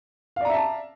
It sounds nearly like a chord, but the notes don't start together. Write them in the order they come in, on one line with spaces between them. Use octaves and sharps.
F5 D5 A#5 E5 A5